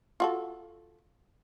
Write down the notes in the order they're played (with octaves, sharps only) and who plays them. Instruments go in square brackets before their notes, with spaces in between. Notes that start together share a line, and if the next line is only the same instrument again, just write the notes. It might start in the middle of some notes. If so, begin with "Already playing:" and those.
[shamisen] F4 F#4 A4